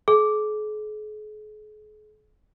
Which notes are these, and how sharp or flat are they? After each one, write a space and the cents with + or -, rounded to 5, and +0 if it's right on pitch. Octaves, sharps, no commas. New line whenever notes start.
G#4 +45